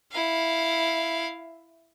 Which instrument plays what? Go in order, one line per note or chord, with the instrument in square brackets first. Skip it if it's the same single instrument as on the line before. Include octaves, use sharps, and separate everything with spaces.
[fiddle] E4 F5